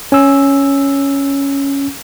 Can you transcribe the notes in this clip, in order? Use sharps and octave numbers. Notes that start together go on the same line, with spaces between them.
C#4 E6